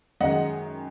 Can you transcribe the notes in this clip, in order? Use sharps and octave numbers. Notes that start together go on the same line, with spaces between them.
F#2 D#3 G#3 D#5 F#5